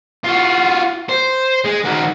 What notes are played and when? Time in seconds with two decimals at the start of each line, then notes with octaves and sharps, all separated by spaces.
0.25 F4 F#4
1.09 C5
1.65 G#3
1.84 D#3 F#4